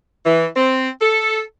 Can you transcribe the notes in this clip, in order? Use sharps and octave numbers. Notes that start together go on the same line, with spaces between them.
E3
C4
A4